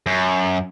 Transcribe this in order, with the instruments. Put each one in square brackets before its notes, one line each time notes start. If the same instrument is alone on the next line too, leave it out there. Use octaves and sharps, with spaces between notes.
[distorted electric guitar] F#2